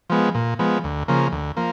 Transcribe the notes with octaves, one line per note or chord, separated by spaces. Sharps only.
F3 G#3 B3
A#2
F3 G#3 B3
D2
C#3 F3 A#3
D2
F3 A#3